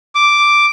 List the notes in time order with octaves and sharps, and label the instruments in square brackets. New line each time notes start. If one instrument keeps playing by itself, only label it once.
[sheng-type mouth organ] D6